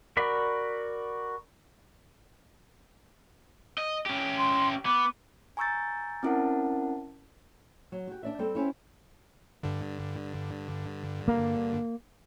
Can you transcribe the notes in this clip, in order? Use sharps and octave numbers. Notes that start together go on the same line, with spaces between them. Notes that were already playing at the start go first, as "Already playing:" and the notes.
F#4 A#4 D5 B5
D#5
C#4 G4
C6
B3 D6
G#5 A#5 C#6 E6 G6 A6
C4 C#4 E4 A#4 F#5 A5
F#3
F#4 G4
D4 D5 E5
G3 C4 A4
C4 C#4 E4
G2 D3
A#3